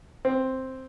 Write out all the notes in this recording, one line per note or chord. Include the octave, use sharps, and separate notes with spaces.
C4